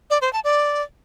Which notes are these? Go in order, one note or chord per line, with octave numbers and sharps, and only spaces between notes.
D5
C5
A5
D5